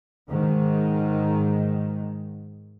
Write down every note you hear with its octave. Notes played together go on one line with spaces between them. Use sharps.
G#2 D#3